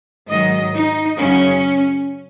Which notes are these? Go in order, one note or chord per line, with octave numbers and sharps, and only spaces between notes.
G#2 D#3 F#3 D#5
D#4
F#2 C#3 F#3 C#4